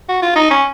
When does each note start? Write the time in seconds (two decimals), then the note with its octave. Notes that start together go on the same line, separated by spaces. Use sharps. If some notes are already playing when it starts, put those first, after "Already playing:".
0.09 F#4
0.22 F4
0.36 D#4
0.51 C#4